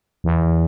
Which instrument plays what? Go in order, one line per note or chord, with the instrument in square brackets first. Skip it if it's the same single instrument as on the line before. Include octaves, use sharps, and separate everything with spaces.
[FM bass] E2